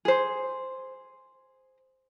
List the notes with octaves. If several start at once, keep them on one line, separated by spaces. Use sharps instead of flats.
G#4 C5